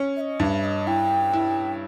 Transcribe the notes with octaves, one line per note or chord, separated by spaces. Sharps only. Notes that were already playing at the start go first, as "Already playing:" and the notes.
Already playing: C#4
E5
D#5
G2 E5
D#5
E4 G5
E4